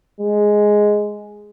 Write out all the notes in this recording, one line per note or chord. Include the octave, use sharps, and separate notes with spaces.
G#3